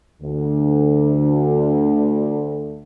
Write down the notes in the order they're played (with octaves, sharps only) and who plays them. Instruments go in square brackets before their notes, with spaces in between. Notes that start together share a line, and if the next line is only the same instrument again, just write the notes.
[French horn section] D2 D3